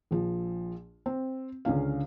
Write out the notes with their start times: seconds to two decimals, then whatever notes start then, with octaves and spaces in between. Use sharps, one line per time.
0.11 A#1 F3
1.06 C4
1.65 C#2 D3 C#4 F5